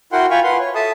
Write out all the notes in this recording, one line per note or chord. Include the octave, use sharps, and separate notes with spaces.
E4 F#4 A#4 F#5 G5 C6
F4 F5 G5 G#5 B5 C#6
B4 F#5 C6
C#5
A4 E5 A5 D#6